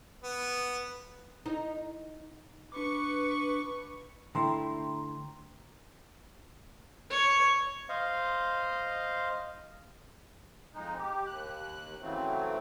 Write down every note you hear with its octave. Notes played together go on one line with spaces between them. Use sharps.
B3
D#4
D4 B4 C#6 D6
D3 A3 E4 G5 A#5 C6
C#5
C5 D#5 F5
F2 G#3 D#4
G4
D#2 F#6
C#3 E3 F#3 A3 C4